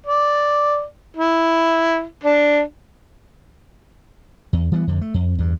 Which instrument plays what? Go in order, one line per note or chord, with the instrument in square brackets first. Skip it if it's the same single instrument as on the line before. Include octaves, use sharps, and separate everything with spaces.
[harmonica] D5
E4
D4
[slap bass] E2
E3 G3 A3 B3
F2 D3
A3
F2
E2 G2